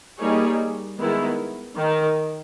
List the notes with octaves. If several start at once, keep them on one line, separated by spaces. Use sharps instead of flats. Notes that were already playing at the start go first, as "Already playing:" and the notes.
G3 A#3 D#4 G#4 C#5
D#3 G#3 B3 E4
D#3